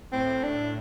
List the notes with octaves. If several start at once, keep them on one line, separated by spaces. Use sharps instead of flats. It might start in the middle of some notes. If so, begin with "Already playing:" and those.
A2 C4
D4